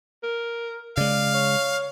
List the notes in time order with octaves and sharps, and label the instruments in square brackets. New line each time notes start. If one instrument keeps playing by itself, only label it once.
[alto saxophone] A#4
[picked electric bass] C#3 G#3 [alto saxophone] D5 [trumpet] F5
[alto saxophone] C#5